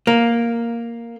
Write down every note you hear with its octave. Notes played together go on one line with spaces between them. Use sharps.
A#3